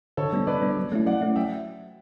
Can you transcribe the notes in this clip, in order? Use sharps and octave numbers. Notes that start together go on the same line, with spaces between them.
D3 A4 C#5
G3 B3 D4
D3 B4 D5
G3 B3 D4
F#3
A3 C#4 E4
F#3 D5 F#5
A3 C#4 E4
F#3 E5 G5